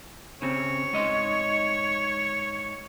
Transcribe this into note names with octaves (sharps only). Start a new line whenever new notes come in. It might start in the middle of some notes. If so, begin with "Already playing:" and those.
C#3 C4 C#5
G#2 D#5 C6